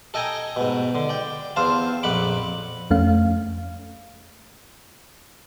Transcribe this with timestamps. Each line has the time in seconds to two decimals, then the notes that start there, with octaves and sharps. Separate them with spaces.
0.14 A4 D#5 G5 G#5 A#5
0.56 G#2 B2
0.95 D3
1.09 D5 G5
1.56 E2 C4 C5 F5 A5
2.03 A#1 F2 F#5 B5 D6
2.90 F2 A3 C#4 F5